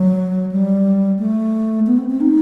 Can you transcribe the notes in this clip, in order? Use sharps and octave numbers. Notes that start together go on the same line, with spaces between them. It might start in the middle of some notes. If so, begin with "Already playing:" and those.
Already playing: F#3
G3
A3
B3
C4
C4
D#4